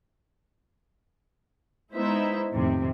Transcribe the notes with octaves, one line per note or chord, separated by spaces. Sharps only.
G#3 B3 D#4 E4 C5 E5
F2 A2 C3 D#3